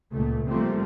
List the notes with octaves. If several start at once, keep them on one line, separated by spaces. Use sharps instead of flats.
C#2 A#2 A3
F3 G3 A3 A#3 C4